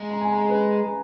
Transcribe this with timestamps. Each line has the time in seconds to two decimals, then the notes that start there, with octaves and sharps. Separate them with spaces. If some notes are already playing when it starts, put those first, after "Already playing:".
Already playing: G#3 A#5
0.10 A#5
0.21 G#5
0.32 A#5
0.49 B4